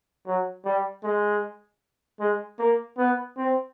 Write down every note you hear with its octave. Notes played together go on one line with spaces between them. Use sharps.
F#3
G3
G#3
G#3
A#3
B3
C4